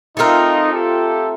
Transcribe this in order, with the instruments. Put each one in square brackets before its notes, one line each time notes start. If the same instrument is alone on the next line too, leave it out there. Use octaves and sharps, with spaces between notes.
[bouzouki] A3 C4 F4 A#4 [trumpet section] D#4
[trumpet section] G4 A4